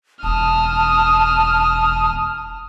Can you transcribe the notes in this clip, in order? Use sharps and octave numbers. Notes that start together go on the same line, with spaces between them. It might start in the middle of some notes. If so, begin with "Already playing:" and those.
E1 A5 D#6 F6